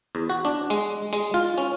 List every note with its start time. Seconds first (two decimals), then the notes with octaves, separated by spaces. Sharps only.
0.15 E2
0.30 F#4
0.45 D4
0.70 G#3
1.13 G#3
1.34 F4
1.58 C#4